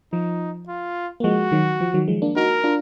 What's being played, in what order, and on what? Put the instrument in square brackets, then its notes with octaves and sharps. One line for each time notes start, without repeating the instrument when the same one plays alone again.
[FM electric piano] F3 [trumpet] D#4
[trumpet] F4
[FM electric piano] A#3
[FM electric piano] F3 G#3 [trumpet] F#4
[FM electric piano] D#3 F#3
F3
D#3 F#3
F3 G#3
A#3 D4
[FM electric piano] D#4 F#4 [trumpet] A#4
[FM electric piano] D4 F4